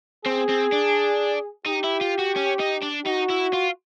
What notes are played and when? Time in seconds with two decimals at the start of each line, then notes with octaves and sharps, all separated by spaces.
0.25 C4 G#4
0.49 C4
0.72 D4
1.66 D#4 G4
1.84 E4
2.01 F4
2.19 F#4
2.36 C#4
2.60 D#4
2.83 D4
3.06 D#4 F#4
3.30 E4
3.53 F4